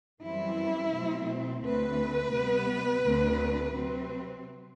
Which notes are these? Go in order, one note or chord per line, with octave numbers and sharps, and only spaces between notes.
F#2 E3 G3 C4 E4
B2 F#3 A3 C4
D2 D3 A3 C4 B4
C3 G3 B3
D2 D3 A3 C4
C3 F#3 C4